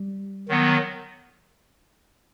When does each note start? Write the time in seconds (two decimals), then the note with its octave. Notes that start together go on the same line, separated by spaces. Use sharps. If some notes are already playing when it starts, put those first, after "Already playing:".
Already playing: G3
0.48 D#3 F#3 B3